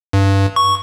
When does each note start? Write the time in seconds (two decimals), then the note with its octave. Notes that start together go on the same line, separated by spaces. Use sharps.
0.13 G2
0.56 C#6